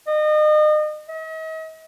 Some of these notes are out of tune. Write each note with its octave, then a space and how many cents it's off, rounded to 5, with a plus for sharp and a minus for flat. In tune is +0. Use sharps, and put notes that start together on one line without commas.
D#5 -35
D#5 +45